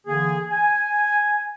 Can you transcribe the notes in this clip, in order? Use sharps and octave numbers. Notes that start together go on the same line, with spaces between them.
D3 E3 A#3 G#4
G#5